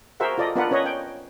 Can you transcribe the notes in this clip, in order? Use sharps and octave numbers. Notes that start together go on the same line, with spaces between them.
F#4 G#4 A#4 C5 E5 F#5
F4 A4 D5 D#5
B3 D4 F4 A#4 B4 F#5
C#4 B4 C#5 D#5
G5